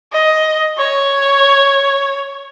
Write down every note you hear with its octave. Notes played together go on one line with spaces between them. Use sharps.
D#5
C#5